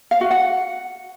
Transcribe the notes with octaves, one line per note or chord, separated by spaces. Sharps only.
F5
F#4
F#5